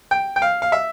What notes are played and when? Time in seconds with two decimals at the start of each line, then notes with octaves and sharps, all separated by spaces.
0.11 G5
0.36 G5
0.42 F5
0.62 F5
0.72 E5